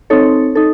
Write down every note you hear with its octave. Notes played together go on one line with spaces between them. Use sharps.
C4 D#4 A4 C#5
D#4 A4